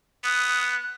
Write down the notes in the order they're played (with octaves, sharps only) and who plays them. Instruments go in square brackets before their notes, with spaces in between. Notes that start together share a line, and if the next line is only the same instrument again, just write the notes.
[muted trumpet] B3 [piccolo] D#6 [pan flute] F#6